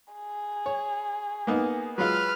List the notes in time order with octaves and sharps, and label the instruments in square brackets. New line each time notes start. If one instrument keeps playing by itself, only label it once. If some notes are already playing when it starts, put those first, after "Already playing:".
[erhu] G#4
[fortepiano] C#5
A#3 B3 D#4
[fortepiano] F#3 G#3 F4 [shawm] B4 [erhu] F6